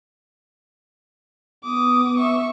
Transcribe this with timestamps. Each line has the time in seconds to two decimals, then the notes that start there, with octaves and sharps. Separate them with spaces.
1.64 B3 D6 D#6
2.18 E5 C#6